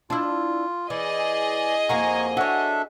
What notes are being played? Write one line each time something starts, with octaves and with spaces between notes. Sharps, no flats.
D4 E4 F4
E3 G#4 D5 D#5
F2 A#3 F#4 G#5 A#5 C#6
D4 F#4 A4 C#5 E5